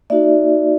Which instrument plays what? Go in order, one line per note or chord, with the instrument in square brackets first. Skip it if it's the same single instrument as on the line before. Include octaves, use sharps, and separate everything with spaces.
[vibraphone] A#3 D#4 F#4 D5 E5